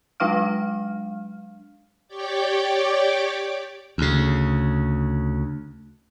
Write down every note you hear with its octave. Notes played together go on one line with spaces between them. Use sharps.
F#3 G#3 D4 F5 F6
G4 C#5 D5 G5 D6
D2 C#3